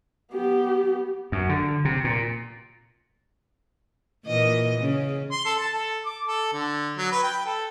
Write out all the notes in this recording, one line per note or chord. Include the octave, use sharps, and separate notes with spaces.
B3 G4
F#2
D3
C3
A#2
A#2 E3 D#5
C#3
C6
A4
A5
A4
D6
A4
D3
F#3
B4
G5
A4